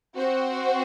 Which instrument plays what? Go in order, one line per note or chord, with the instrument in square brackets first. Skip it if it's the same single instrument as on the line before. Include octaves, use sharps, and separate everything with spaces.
[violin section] C4 F#4 C5